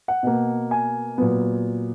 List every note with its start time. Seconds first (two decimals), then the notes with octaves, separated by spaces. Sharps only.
0.08 F#5
0.23 B2 A#3
0.71 G#5
1.18 A#2 F#3 B3